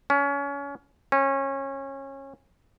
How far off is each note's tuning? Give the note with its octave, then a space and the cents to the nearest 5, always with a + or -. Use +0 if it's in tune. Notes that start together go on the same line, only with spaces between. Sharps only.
C#4 +25
C#4 -25